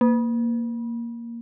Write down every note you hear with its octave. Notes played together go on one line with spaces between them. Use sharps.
A#3